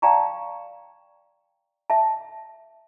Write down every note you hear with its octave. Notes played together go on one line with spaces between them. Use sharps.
D5 F5 G5 A5 A#5 C#6
E5 A5